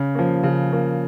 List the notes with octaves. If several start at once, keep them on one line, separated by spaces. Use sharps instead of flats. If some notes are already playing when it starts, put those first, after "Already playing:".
Already playing: C#3
F3 A#3
C#3
F3 A#3